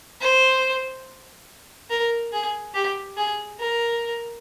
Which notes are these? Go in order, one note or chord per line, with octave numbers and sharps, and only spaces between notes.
C5
A#4
G#4
G4
G#4
A#4